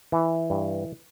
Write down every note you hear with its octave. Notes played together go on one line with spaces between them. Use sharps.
E3
G2